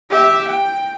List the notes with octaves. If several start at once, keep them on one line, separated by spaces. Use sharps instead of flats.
G4 E5
G5